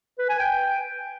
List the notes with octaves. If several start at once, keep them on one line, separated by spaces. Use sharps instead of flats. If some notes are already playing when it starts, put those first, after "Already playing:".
B4
G#5
G5